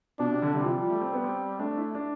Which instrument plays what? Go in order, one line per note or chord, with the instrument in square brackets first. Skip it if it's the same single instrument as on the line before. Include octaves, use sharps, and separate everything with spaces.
[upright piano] B2 [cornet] D4
[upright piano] C3
D3
[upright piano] C3 [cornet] G3
[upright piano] F3
E3
F3
A3
C4
B3
C4
[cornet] A3 [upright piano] D4
[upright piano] E4
D4